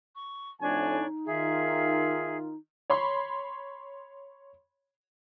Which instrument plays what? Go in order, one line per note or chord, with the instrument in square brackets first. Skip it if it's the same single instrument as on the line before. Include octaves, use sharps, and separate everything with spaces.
[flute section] C#6
[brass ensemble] F2 A2 G#5 [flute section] D4 C#5 C#6 [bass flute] D#4
[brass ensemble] D#3 F4 [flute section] G#4 E5
[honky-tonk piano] C#5 B5 C6